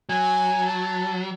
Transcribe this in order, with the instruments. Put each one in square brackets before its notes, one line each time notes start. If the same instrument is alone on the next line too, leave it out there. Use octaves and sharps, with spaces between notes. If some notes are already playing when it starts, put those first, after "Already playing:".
[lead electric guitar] F#3 [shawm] G#5
[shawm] A5